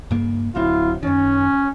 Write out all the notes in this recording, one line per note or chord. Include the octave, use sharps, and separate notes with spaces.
G2 C#3 A#3
D1 D3 F#3 C4 E4 F4
F#2 D#3 C#4